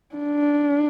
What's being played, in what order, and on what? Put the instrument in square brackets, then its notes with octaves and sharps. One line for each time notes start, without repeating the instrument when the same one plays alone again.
[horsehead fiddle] D4